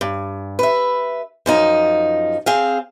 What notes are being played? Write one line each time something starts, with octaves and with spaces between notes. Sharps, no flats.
G2
B4 E5
F#2 F3 D#4
C4 G#4 F5